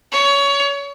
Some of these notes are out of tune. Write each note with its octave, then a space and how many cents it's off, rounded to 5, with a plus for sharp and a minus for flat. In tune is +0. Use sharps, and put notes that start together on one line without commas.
C#5 +20